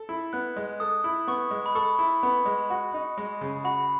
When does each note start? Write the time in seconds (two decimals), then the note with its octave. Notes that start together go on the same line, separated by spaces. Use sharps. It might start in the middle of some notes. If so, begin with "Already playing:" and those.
Already playing: A4
0.09 E4
0.33 B3 F#6
0.56 G#3
0.80 A4 D#6
1.04 E4
1.27 B3 C#6
1.51 G#3
1.66 B5
1.75 A4 C#6
1.99 E4
2.23 B3
2.46 G#3
2.70 F#4
2.94 D#4
3.18 G#3
3.41 C#3
3.64 F#4 B5